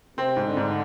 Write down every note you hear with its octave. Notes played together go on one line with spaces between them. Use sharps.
C3 C4
G#2
D3
G#2